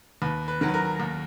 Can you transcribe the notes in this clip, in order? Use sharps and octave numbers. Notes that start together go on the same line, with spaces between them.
D#2 B4
B4
D#3 F#3
B4
A#4
D#2